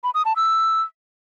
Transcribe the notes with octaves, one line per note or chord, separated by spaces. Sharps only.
B5
D#6
A5
E6